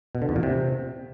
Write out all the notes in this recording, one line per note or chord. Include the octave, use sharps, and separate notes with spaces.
B2
D3
E2
A#2
C3